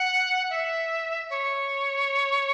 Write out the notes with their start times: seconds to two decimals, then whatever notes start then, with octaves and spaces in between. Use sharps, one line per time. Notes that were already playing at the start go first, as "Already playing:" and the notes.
Already playing: F#5
0.50 E5
1.30 C#5